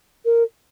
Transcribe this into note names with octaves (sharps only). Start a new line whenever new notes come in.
A#4